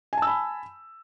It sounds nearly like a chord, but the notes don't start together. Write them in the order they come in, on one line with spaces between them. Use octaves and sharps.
G#5 A5 E6 B5